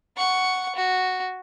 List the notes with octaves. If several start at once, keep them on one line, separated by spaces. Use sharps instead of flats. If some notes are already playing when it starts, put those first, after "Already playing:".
F#5 C#6
F#4